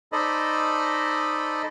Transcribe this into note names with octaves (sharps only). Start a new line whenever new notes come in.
D#4 A4 C5 D5 D#5 B5